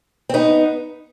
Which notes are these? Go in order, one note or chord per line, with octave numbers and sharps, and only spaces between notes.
C4
B3 D#4